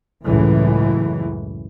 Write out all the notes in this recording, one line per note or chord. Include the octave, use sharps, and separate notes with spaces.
C#2 F#2 A2 E3